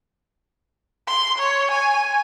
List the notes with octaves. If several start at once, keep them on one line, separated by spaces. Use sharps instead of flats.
C6
C#5
G#5